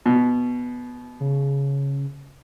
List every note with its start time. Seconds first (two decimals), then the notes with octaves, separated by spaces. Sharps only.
0.06 B2
1.20 C#3